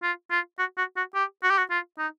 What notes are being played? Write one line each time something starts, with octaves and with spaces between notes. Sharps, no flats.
F4
F4
F#4
F#4
F#4
G4
F#4
G4
F#4
F4
D#4